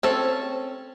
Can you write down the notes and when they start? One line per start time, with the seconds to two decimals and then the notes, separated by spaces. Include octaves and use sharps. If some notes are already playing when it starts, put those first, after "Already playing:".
0.03 C4 C#4 A4